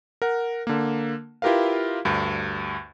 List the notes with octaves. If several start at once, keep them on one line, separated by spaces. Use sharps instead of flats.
A#4 F#5
D3 A#3
E4 F4 G4 A#4 B4 F5
D2 G2